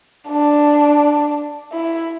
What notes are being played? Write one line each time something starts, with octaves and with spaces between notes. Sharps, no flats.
D4
E4